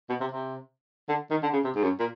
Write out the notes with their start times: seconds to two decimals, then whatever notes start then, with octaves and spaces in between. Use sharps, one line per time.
0.09 B2
0.21 C3
0.32 C3
1.09 D3
1.31 D#3
1.43 D3
1.53 C#3
1.64 C3
1.75 G#2
1.83 F#2
2.00 A#2